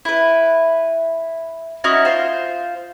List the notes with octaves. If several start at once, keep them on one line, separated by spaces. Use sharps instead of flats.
E4 B4
C#4 D#4 E4 F#4
F4 C5